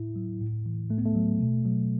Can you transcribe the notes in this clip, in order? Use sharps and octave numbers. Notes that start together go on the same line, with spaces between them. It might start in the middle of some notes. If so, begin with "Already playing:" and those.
Already playing: A2 E4
F#3
A2
E3
A2 A3
B3
A3
F#3
B2
F#3